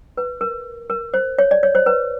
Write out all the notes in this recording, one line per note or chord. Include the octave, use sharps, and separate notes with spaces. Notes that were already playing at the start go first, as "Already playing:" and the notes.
B4
A#4
A#4
C5
C#5
D5
C#5
C5
B4